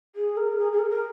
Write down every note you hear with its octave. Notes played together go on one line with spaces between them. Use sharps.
G#4
A#4
G#4
G#4
A#4
A#4